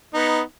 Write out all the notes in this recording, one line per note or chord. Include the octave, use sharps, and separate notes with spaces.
B3 D#4